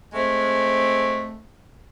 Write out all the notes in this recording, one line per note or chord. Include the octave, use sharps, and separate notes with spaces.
G#3 A3 C4